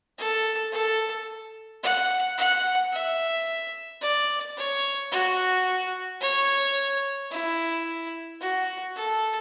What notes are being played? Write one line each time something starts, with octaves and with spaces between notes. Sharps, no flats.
A4
A4
F#5
F#5
E5
D5
C#5
F#4
C#5
E4
F#4
A4